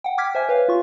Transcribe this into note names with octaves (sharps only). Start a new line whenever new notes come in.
F#5 G5
G5 D6 F6 G#6 B6
C5 E5 G#5
B4 C#5 F5
F4 C#6